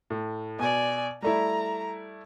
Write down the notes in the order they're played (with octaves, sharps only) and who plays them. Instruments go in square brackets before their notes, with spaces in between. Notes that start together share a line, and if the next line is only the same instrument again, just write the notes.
[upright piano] A2
[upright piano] B2 [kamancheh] D5 G#5
[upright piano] G3 A3 E4 [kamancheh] A#5